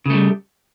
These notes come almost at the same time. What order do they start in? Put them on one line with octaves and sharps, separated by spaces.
C#3 A3 G3